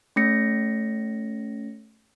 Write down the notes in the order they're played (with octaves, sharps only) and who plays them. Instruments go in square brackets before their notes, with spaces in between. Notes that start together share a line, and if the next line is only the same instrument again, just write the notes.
[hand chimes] A3 C#4 A#6 C#7